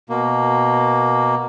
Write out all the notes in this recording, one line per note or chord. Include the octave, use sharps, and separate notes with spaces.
B2 A#3